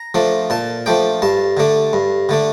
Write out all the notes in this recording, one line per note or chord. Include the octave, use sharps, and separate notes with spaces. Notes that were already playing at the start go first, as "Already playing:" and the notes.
Already playing: A#5
F3 A3 D4
A#2 A5
F3 A3 D4 G5
G2 A5
D3 A3 D4
G2
D3 A3 D4